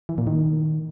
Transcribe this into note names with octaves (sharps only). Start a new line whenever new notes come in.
E3
A#2
D#3